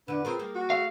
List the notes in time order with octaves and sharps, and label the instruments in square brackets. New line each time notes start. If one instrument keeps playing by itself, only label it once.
[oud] E2 D3 [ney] D4 [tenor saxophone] B4
[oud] C4 F4 A#4 [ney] G#4
[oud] G3 A#3
[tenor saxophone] F#4
[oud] A3 [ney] G#4 [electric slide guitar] F5